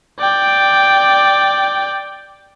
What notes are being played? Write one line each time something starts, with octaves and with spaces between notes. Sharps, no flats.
D5 G5